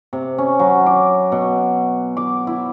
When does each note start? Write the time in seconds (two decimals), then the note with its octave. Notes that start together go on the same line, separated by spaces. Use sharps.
0.13 C3
0.38 C#4
0.59 F#3
0.86 D6
1.32 B2
2.17 D6
2.47 E4